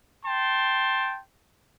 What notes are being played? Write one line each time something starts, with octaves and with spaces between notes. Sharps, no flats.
G5 A5 C6